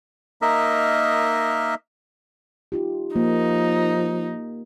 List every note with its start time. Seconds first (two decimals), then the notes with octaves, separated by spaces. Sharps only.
0.42 A#3 D#4 A#4 D#5 E5
2.72 D#4 F4 G4
3.16 F3 A#3 D#4